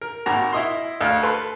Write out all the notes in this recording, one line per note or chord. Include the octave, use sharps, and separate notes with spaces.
A#4
G#1 A#3 F#4 A#5
E4 D#5 C6
D2 F5 F6
A4 B4 C6